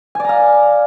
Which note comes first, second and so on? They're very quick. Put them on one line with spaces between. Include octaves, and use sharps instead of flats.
G#5 D5 A#5 F5